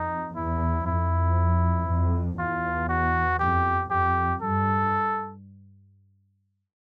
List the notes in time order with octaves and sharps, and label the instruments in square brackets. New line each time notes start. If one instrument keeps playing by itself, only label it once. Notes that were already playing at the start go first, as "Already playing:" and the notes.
Already playing: [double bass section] F2 [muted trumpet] D#4
[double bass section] E2 [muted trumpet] E4
[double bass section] F2 [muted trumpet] E4
[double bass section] F2
[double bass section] E2 [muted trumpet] F4
[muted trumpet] F#4
[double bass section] F2 [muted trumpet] G4
[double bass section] F2 [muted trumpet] G4
[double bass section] G2 [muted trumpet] A4